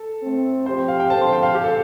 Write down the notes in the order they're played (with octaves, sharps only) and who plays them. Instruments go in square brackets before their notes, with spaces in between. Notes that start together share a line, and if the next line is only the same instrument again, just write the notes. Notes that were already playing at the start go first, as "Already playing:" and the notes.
Already playing: [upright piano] A4
[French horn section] A2 A3 C4
[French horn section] F3 C4 G4 [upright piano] C5
[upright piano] F5
G5
[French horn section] D3 F3 C4 A4 C5 [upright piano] A5
[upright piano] C6
G5
F5
G4
A4